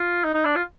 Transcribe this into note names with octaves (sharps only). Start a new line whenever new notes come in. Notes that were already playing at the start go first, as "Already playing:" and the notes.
Already playing: F4
D#4
D#4
D4
F4